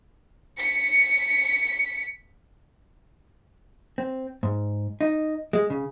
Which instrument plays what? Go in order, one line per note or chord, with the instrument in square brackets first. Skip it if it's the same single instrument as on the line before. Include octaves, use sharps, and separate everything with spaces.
[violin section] B6 C#7
[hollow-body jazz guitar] C4
G#2
D#4
G#3
C#3